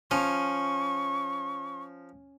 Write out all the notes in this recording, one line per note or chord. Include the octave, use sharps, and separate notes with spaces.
F3 C#4 C#6